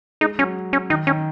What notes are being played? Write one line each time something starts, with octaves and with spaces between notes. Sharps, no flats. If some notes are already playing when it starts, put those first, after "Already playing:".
G#3 D#4
F#3 C#4
C#4
D#3 D#4
D#3 C#4